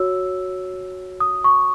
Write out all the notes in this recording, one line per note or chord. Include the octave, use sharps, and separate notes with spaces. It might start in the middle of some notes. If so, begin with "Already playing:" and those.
Already playing: F#4 C#5 E6
D#6
C#6